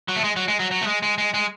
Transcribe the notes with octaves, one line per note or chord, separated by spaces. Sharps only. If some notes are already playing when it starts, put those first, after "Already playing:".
F#3
A3
G#3
F#3
G#3
F#3
F#3
A3
G#3
G#3
G#3
G#3